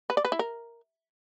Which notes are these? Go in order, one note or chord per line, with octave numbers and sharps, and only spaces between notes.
B4
D5
B4
E4
A#4